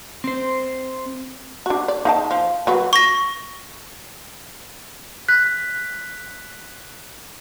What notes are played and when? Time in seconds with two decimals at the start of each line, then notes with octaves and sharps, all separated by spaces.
0.24 C4 C5
1.66 D4 F#4
1.88 D5
2.05 D#4 F5 A5
2.31 F3
2.67 F#3 F#4 B4
2.93 C#6 A#6
5.28 F#6 B6